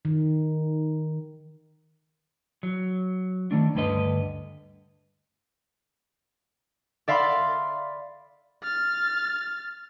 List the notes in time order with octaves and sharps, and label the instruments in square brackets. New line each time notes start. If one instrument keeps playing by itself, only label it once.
[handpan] D#3
[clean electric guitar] F#3
D#3 A3 D4
D2 G2 D3 B4 D#5
[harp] D5 E5 F5 B5 C6
[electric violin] F6 A6